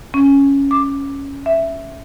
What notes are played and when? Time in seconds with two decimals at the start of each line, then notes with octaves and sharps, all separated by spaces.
0.14 C#4
0.71 D6
1.46 E5